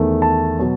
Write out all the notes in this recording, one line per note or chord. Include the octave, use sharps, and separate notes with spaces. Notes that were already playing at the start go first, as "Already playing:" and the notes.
Already playing: E2 D#3 A3
A5
B2 F#3